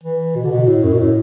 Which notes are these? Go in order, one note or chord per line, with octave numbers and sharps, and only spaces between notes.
E3
B2
D3
B2
A2
F#2
B2
A2